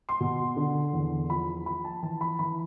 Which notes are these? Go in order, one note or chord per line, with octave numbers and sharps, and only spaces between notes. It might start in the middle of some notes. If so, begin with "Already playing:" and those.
C6
B2
D3
E2
F3 B5
F3 B5
A5
E3 A5
B5
E3 B5